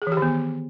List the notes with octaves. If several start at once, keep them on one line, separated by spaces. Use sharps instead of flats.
G#4
E3
G4
D#3
B3